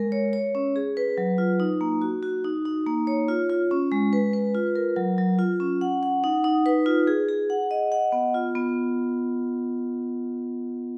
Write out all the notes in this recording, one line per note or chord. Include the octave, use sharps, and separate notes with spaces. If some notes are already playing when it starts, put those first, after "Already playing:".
Already playing: G#3 A#4
C#5
C#5
C#4
G#4
B4
F#3
F4
D#4
A#3
F#4
F#4
D#4
D#4
A#3
C#5
F4
F4
C#4
G#3
B4
B4
F4
A#4
F#3
F#3
F4
C#4
F#5
F#5
D#4
D#4
B4
F4
G#4
G#4
F#5
D#5
F#5
B3
F4
B3